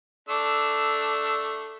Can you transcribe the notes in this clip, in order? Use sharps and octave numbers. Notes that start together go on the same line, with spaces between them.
A3 D4 E6